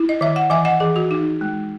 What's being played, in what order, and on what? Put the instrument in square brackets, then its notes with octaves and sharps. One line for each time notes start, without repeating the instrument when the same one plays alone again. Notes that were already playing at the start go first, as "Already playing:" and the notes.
Already playing: [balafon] E4
D#5
D#3 E5
F#5
E3 E5 G#5
D#5 F#5
E3 G#4
F#4
D#4
G#3